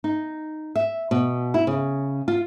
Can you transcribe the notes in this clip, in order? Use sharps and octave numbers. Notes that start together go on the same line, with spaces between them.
D#4
E5
B2
E4
C#3
F4